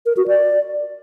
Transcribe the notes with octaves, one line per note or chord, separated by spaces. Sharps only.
A#4
F#4
D5